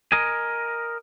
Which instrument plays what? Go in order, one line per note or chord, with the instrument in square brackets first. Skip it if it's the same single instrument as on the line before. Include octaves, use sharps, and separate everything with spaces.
[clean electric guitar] A#4 D#5 G#5